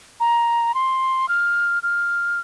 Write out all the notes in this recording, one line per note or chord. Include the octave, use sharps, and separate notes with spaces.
A#5
C6
F6
F6